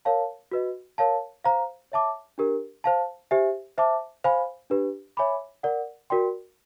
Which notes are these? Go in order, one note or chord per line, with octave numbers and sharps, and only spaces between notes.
A#4 C#5 F5 A5
F#4 B4 D#5
A#4 C#5 F5 A5
C5 F5 A#5
C#5 E5 A5 D6
D4 G4 A#4
C5 F5 A5
G4 C5 E5 G#5
C5 E5 A5 D6
C5 F5 G#5 B5
D4 G4 B4
C#5 E5 G#5 B5 D6
A#4 D5 F#5
F#4 A#4 D5 G5 C6